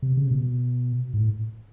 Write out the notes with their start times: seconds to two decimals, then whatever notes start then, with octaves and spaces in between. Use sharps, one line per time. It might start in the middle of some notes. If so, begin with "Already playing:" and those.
0.02 C3
0.17 C#3
0.27 C3
0.31 B2
1.14 G#2
1.19 A2